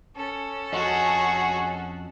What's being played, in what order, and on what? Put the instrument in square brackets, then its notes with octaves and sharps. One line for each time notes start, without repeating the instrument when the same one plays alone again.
[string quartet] C#4 A4
[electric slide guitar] F2 D#5 [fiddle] F#4 G#4 [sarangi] F#5